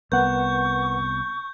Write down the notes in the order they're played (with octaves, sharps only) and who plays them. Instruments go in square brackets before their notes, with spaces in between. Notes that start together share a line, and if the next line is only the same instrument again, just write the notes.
[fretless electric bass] C2 B3 [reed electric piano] A#4 B4 F#5 [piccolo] C#6 [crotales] G6